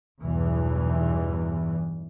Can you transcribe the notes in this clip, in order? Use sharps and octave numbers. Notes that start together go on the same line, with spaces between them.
B1 E2 G2 B2 E3